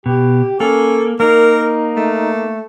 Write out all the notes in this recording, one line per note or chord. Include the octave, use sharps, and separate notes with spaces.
B2 G4
A#3 C#4 A4
A#3 D#4 A#4
A3